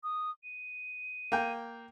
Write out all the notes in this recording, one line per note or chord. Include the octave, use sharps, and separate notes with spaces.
D#6
D#7
A#3 G5